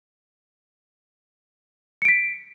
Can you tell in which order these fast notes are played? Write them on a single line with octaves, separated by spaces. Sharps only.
C#7 D7 B6